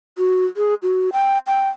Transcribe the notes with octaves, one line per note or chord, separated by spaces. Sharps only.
F#4
G#4
F#4
G5
G5